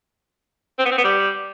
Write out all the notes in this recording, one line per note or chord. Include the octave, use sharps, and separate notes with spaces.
C4
B3
C4
B3
G3